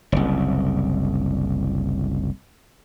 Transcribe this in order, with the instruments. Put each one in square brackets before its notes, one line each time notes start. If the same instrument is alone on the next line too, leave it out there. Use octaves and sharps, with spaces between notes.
[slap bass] F#1 C2